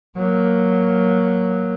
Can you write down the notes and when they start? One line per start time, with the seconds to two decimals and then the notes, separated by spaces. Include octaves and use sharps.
0.16 F#3 A#3